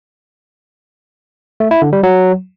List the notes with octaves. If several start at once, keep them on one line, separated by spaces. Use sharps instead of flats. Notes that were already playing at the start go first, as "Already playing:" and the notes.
A3
E4
D3
G3
F#3